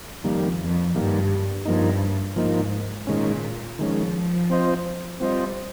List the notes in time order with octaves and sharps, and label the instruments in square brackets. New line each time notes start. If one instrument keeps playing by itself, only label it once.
[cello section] F2 [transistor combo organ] D#3 G3 A#3
[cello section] F2
[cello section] G2 [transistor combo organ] D#3 G3 A#3
[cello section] G2 [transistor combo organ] F3 A#3 D#4
[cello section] G#2 [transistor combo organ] F3 A#3 D#4
[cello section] A#2 [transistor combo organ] D#3 G#3 C#4
[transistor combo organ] D#3 G#3 C#4 [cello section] F3
[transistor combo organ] C4 F4 C5 D#5
[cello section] G3 [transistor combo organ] C4 F4 C5 D#5